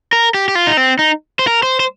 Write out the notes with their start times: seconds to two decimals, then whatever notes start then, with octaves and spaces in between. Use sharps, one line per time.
0.13 A#4
0.34 G4
0.49 G4
0.55 F4
0.67 D#4
0.77 C4
0.99 D#4
1.39 C5
1.47 A#4
1.63 C5
1.80 C5